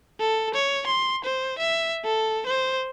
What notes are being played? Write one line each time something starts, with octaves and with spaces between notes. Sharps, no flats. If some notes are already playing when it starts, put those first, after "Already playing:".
A4
C#5
C6
C5
E5
A4
C5